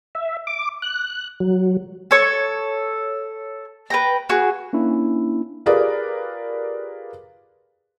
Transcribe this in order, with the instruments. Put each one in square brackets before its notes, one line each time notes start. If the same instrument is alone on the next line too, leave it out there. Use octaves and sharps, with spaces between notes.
[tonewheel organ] E5
D6
F#6
F#3
[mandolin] A4 C#5
B4 G5 A#5
F#4 G#4
[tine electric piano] A#3 C#4 D4 E4
[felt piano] F4 G4 G#4 A#4 B4 D5